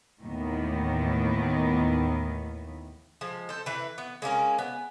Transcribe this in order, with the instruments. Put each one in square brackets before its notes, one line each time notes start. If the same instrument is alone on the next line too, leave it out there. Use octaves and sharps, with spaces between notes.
[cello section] D#2 A2 D#3 E3 B3
[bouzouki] F3 G#3
A4 C5
E3 B4
B3
G#3 A#3 C#4 A#4
B3